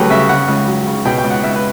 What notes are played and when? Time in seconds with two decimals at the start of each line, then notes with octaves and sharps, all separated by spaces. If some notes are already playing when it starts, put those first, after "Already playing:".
Already playing: D2 G2 C#3 F#3 G4 A4 B4
0.10 C#3 E5
0.29 C#3 F#5
0.48 C#2
0.68 F#3
0.87 C#3
1.05 B2 G5
1.19 G5
1.24 C#2
1.30 F#5
1.43 C#2 E5
1.56 B4